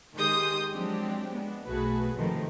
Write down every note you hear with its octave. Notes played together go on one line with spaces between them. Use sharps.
D#3 G#3 G4 C6 D#6 G6
F3 F#3 G#3 C4 D4 G4
G#3 B3 D4
B1 A3 F#4 G#4 B4
G#2 C3 D#3 F3 A3